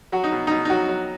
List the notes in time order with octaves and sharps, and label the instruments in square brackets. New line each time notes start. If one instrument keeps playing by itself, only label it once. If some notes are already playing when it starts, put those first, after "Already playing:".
[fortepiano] F#3 F#4
D#4
B2
D#4
B2
D#4
F#3 F#4
F#3